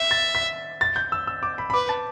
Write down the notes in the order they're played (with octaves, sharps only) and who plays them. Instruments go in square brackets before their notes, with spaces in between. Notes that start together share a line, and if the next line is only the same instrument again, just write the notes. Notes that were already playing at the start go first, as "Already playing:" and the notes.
Already playing: [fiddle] E5
[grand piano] A6
B6
A6
G6
E6
E6
D6
B5
B5
[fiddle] B4 [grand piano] D6
[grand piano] A5